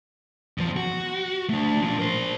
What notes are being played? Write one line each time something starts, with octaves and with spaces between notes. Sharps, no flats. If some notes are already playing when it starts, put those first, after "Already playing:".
E2 F3
F#4
A3 D4
F3 D4
A#4 C5